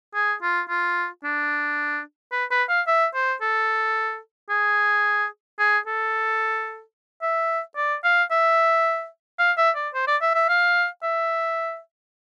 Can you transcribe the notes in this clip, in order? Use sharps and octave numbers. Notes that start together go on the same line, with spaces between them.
G#4
F4
F4
D4
B4
B4
F5
E5
C5
A4
G#4
G#4
A4
E5
D5
F5
E5
F5
E5
D5
C5
D5
E5
E5
F5
E5